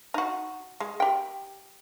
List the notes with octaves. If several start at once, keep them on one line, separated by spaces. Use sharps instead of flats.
D#4 F#4
G#3
G4 G5